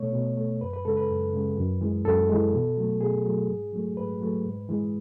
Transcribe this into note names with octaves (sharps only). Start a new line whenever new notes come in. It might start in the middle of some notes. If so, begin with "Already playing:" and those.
Already playing: B2 A3 C#5
B2
A3
F#2 B4
B4
C#3 G#3 A4
B4
F#2
C#3 G#3
F#2
E3 G#3
F#2 A4
E3 G#3
B2
F#3 A3
B2 G#4
F#3 A3
G#2
F#3 A3
G#2 B4
F#3 A3
G#2
E3 G#3